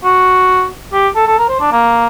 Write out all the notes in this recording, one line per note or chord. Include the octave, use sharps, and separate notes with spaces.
F#4
G4
A4
A4
A#4
C5
D4
A#3